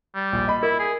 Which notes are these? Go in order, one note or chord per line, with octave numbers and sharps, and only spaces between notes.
G3
A#1
D#5 B5
E4 A#4
G#4